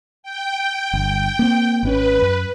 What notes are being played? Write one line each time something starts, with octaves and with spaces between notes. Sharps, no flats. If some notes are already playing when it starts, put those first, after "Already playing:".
G5
G1
A#3 C4
G#1 B2 C#4 B4
F#2